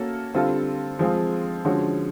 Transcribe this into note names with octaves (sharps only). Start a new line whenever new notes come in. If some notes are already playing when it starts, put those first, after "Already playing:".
Already playing: A#3 C#4 F#4 A4
D3 G3 C4 F4 A4
F3 G#3 C4 F4 G#4
D3 F3 G#3 C#4 F#4